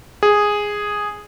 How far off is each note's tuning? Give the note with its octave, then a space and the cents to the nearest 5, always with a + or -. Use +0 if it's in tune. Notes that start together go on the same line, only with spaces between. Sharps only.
G#4 -5